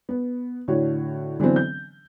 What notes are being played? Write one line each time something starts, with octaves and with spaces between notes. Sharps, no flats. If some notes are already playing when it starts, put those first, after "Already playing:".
B3
A2 D3 F#4 C#5
D3 E3 F#3 B3 C4
G6